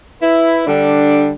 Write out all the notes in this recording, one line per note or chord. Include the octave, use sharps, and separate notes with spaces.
E4 B4
D3 G3 D4